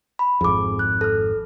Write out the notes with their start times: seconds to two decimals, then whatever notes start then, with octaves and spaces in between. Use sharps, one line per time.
0.19 B5
0.41 G#1 F2 G#4 D6
0.79 F#6
1.01 A4 F6